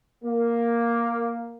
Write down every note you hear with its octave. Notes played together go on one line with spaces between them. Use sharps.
A#3